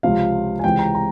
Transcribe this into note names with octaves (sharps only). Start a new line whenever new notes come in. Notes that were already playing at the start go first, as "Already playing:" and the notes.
C#2 C3 F3 F5
G#5
C#2 C3 E3 G#3 G5
A#5
A#5